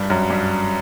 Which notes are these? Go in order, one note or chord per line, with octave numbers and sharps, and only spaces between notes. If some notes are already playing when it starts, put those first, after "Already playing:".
Already playing: G2
F#2
G2